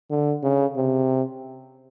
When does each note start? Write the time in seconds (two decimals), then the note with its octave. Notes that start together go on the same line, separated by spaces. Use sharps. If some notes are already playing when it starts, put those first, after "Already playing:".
0.10 D3
0.43 C#3
0.76 C3